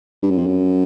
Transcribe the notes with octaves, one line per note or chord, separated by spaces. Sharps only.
G2
F#2
F2
F#2